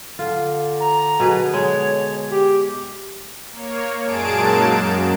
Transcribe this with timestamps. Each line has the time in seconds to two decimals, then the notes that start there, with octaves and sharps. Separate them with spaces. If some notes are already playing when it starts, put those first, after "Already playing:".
0.19 D3 F4
0.80 A#5
1.20 B2 D3 G#4 B4
1.54 G#3 C#5
2.30 G4
3.52 A#3 C#5
4.01 F#2 A#2 G#3 G#4 A5 D7
4.37 F#2 F#3 A#3 D#4 A5
4.70 F#2